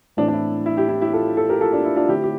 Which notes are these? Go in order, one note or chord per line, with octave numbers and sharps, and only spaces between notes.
A2 E3 A3 C4 D4
D4
E4
E4
E4 G4
E4
E4 G4
F4 A4
F4 A4
G4 A#4
F4 A4
D4 F4
E4
D4 F4
D3 A3 C4 E4 G4
G4